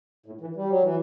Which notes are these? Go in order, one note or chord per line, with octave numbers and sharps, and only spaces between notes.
A2
E3
G3
F#3
E3